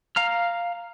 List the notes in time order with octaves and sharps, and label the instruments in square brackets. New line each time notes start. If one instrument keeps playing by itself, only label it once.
[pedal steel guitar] F5 A#5 F6